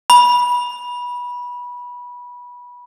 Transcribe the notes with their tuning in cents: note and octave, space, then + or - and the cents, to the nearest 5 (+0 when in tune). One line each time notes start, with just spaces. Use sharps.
B5 -20